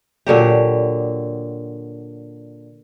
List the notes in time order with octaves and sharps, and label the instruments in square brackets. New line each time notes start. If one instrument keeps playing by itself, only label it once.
[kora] A#2 D3 F#3 G4